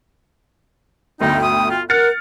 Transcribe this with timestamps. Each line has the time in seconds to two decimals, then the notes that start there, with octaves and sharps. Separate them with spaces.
1.20 G1 D2 D#4 G5
1.43 D#6
1.70 F4
1.90 A#4 F#5 F6 A6 C#7